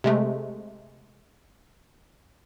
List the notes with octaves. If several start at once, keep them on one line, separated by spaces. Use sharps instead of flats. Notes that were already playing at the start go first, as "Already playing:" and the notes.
C3 G#3 A3